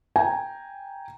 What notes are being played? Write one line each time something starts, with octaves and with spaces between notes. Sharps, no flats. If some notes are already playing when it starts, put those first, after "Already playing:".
G5 G#5 A#5